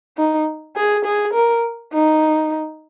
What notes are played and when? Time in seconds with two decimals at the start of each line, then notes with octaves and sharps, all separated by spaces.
0.17 D#4
0.76 G#4
1.05 G#4
1.33 A#4
1.93 D#4